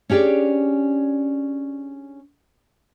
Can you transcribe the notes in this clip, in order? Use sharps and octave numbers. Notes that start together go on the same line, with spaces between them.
C#4 D4 G4 G#4 D5